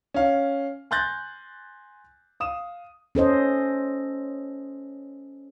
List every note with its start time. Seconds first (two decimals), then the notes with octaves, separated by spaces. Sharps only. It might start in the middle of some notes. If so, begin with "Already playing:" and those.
0.14 C#4 F5
0.91 G#5 C6 F#6 G6 A6 A#6
2.40 F5 D#6 E7
3.15 C#4 A4 C5 D#5